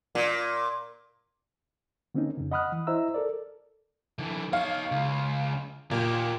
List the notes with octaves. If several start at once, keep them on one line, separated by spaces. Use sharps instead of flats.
A#2
D3 A#3 C4 C#4 D#4
F2 C#3
D#5 F#5 B5 D#6 F6 F#6
E3
E4 C5 D#5 E5 A#5 E6
A4 A#4 D5
D3 E3
D#4 C#5 F5
C#2
A#2 A#3 G4